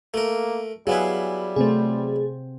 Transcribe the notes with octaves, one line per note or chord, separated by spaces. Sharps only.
A3 A#3 A#4
F#3 G3 B3 E4 G#4 F5 F#5
C3 A3 C4 G#4 C5